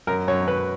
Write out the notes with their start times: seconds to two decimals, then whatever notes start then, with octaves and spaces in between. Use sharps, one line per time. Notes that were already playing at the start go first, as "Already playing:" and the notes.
0.07 F#2 A#4
0.28 F#2 C#5
0.47 F#2 B4